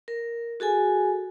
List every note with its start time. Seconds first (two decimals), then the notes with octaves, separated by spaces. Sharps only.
0.08 A#4
0.60 F#4 G#4 A4 G#5